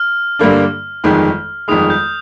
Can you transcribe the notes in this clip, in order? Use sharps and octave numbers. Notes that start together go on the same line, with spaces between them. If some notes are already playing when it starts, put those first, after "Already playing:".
Already playing: F6
G2 D3 G3 A#3 D4
G1 F2 D#3 G#3
G1 F2 D#3 G#3 D#6
G6